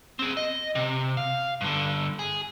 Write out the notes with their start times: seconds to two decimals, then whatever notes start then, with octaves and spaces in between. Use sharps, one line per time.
0.19 C4 G#4
0.37 D#5
0.75 C3
1.17 F5
1.61 G2 D3
2.19 G#4